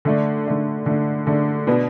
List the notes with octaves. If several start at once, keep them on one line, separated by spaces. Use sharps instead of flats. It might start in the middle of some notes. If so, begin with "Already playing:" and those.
D3 A3 D4
D3 A3 D4
D3 A3 D4
D3 A3 D4
B2 B3 D4